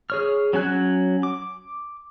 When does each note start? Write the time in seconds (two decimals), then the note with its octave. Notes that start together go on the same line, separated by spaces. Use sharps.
0.10 G#4 C#5 F6
0.53 F#3 C#4 G#5 F#6
1.23 D6